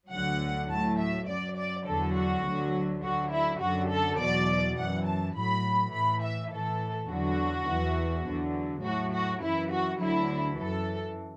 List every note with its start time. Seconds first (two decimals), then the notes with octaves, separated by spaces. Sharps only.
0.12 D2 D3 F#3 F#5
0.70 A2 F#3 A5
0.99 E5
1.28 F#2 F#3 D5
1.57 D5
1.86 E2 D3 F#3 A4
2.15 F#4
2.44 D2 D3 F#3
3.03 D2 D3 F#3 F#4
3.31 E4
3.61 F#2 D3 F#3 F#4
3.90 A4
4.19 E2 B2 F#3 D5
4.77 F#2 E3 F#5
5.06 A5
5.35 A2 F#3 B5
5.93 A2 E3 B5
6.22 E5
6.51 A2 E3 A4
7.10 E2 D3 F#3 F#4
7.68 E2 E3
8.26 E2 D3 F#3
8.84 A2 F#3 F#4
9.13 F#4
9.42 F#2 E3 E4
9.72 F#4
10.01 D2 D3 F#3 E4
10.59 F#2 E3 A4